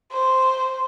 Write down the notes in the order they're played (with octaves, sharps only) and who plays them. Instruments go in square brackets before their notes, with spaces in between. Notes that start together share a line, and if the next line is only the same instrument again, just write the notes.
[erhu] C5